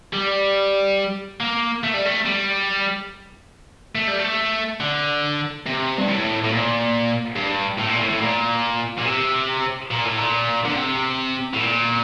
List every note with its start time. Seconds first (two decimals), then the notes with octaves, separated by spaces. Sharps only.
0.13 G3
1.40 A#3
1.83 A3
1.94 G3
2.06 A3
2.26 G3
3.95 A3
4.08 G3
4.19 A3
4.80 D3
5.66 C3
5.98 G2
6.08 A2
6.44 A2
6.51 A#2
7.36 G2
7.79 A2
7.89 A#2
8.00 A2
8.10 A2
8.21 A#2
8.98 A#2
9.05 C3
9.91 A#2
10.05 A2
10.18 A#2
10.65 D3
10.76 C3
11.54 A2
11.60 A#2